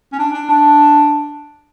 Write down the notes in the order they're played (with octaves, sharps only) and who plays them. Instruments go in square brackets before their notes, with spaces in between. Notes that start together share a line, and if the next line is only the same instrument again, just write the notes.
[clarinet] C#4
D4
D4
D4